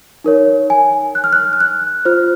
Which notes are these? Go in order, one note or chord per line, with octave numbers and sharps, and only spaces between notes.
D#4 A#4 C#5
G#5
F#6
F6
F#6
F6
F#6
F4 C5 F6